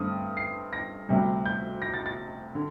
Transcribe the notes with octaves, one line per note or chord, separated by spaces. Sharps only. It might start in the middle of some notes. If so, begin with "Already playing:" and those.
Already playing: G2 D3 A3 C4 D#6
C7
A#6
D2 C3 G3
G6
A#6
A6
A6
D3